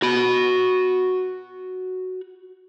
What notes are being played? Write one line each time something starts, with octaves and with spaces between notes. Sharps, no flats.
F#4 B5